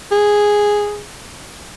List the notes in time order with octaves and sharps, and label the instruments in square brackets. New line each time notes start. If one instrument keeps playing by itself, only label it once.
[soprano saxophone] G#4